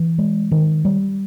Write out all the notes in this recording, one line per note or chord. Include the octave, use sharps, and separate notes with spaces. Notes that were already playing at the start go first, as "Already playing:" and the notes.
Already playing: E3
G#3
D#3
G3